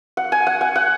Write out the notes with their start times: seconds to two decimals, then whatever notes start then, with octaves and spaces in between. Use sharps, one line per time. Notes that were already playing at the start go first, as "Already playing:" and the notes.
0.17 F#5
0.32 G#5
0.47 F#5
0.61 F#5
0.76 F#5